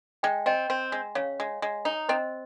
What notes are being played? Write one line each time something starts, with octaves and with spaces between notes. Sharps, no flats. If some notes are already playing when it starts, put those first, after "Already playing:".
G#3 G5
C4 D#5 G5
C4
G#3
C#3 C#5 F5
G#3
G#3
D#4
C4 C5 D#5